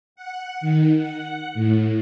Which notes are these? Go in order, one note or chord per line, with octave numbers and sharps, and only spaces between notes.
F#5
D#3
F#5
A2